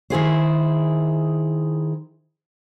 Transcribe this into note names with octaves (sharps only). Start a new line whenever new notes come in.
D#3 E4 G#4 C5